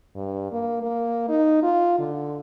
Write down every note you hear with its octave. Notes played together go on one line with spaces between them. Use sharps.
G2
A#3
A#3
D#4
F4
D3